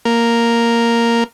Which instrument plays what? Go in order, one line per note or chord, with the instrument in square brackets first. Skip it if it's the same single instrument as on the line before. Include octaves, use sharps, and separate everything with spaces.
[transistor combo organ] A#3